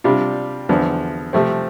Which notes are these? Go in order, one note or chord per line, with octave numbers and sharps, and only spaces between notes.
C3 G3 D4 F4
E2 D3 F3
C3 F3 A3 C4